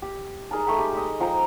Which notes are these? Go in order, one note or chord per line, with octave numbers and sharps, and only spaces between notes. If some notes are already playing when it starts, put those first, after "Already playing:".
G4
D#4 G#4 A#4 A5
A3 G5 B5
G4
G#3 D#5
F3 G5 A#5